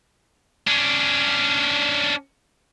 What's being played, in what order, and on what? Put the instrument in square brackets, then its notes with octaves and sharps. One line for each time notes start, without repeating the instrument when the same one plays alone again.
[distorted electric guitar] C#4 D4